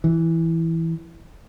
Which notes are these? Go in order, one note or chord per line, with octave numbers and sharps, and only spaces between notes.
E3